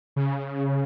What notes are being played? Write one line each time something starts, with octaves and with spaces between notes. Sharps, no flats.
C#3